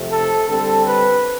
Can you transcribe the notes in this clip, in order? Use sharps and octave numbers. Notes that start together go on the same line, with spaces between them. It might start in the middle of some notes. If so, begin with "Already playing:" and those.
Already playing: C3 F3 A3 C4
A4
D3 G3 C4 A4
B4